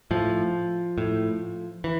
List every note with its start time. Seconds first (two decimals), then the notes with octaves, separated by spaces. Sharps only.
0.11 A2 F3
0.98 A2
1.84 E3